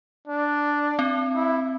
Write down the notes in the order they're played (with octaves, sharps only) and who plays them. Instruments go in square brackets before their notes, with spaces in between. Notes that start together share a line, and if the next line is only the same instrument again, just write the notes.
[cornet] D4
[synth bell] C4
[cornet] E4